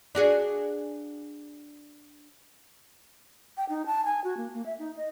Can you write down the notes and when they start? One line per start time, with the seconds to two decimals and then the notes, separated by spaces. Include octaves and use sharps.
0.15 D4 F#4 G#4
3.57 G5
3.69 D#4
3.86 A5
4.05 G#5
4.24 F#4
4.37 A#3
4.53 A#3
4.66 E5
4.79 D#4
4.97 D#5